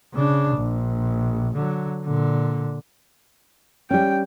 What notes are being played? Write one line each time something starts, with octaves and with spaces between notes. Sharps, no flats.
C#3 D4
A#1
D3 F#3
A#2 D3
G3 C#4 G5